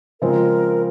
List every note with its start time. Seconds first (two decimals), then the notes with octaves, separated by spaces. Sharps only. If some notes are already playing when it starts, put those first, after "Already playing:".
0.21 C#3 F3 G#3 C4 A#4